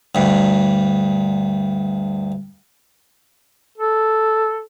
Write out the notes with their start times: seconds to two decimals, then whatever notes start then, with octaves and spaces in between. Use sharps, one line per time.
0.15 D2 G2
3.78 A4